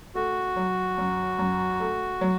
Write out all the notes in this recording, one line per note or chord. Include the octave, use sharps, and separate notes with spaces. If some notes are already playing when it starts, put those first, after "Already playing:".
A3 F#4
F#3
F#2
F#2
A3
F#3